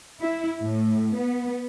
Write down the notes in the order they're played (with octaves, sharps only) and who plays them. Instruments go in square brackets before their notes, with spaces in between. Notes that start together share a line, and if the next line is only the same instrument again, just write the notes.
[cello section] E4
A2
B3